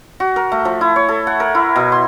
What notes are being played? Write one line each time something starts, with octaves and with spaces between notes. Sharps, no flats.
F#4
A#4
A3
F3
E4
C#5
A4
F#5
A#4
E4
B2
C6